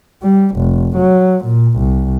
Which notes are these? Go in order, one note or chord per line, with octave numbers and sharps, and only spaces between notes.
G3
F1
F#3
A#2
C2